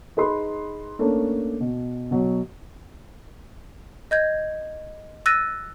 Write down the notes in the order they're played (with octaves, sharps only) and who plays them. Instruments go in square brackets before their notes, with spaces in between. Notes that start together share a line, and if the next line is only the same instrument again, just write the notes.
[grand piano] D#4 G#4 B4 B5 C6
A3 A#3 C#4 D4
B2
B2 F#3
[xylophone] D#5 G6 G#6
E6 F#6 A6 A#6 D#7